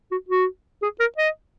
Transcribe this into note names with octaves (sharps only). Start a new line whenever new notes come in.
F#4
F#4
G#4
A#4
D#5